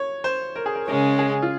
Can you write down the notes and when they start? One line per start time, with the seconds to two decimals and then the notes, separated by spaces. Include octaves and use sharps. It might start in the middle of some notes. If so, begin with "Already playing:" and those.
Already playing: C#5
0.24 C5
0.56 A#4
0.66 G#4
0.75 A#4
0.87 C#3 G#3 C#4 A#4
1.19 G#4
1.42 F4